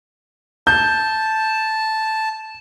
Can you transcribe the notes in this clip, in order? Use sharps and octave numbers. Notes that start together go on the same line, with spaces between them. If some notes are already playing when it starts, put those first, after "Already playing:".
A5 G6